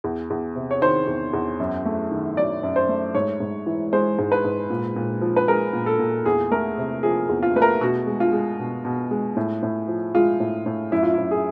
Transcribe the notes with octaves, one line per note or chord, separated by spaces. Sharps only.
E2
E2
C3
C#5
D#3 C5
E2
E2
F#2
A3
D#3
F#3 D5
F#2
C5
A3
G#2 C#5
G#2
E3
G#3 C5
G#2
B4
G#2
A#2
A#2
F3
B4
G#3 A#4
A#2
A4
A#2
E2 G#4
A3 A#4
C3
F3 G#4
E2
F4
A3 B4
A#4
B2 F#4
G#3
F4
G#3
B2
B2
G#3
A2
A2
F3
G#3 F4
A2
A2
F#2 E4
F4
F#2 E4
G#4